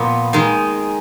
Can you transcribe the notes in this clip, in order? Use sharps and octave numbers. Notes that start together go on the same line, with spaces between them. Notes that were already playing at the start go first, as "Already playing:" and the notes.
Already playing: A#2 F3 B3
D#3 G#3 D#4 A#4